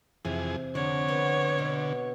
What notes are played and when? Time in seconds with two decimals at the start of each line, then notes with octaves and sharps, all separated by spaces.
0.25 F2 C3 E3 G#4
0.75 F2 D3 C#5 F#5
1.08 B3
1.59 B2